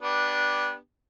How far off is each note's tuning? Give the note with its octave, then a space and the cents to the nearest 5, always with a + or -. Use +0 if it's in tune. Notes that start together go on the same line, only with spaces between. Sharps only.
B3 -20 D4 +0 G4 +0